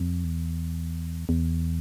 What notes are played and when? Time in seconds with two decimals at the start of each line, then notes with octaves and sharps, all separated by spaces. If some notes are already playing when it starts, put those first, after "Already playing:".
Already playing: F2
0.24 E2
1.29 E2